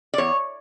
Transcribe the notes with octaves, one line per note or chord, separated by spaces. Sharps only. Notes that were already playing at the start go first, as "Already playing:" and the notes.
D5
E2 C#5